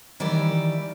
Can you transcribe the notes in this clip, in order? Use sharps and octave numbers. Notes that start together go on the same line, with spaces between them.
D#3 E3 G3 E4 D5